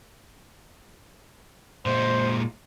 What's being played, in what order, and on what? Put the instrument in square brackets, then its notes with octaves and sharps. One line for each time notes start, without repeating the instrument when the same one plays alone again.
[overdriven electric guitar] A#2 G#3 [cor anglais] C5